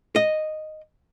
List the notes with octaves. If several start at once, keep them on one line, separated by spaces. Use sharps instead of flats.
D#5